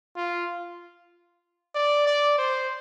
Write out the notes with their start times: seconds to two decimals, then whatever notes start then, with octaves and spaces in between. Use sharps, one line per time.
0.16 F4
1.75 D5
2.06 D5
2.38 C5